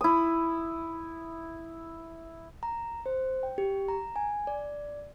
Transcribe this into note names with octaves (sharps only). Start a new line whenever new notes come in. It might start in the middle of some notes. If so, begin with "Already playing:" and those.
E4 D#6
A#5
C5
G5
G4
A#5
G#5
D5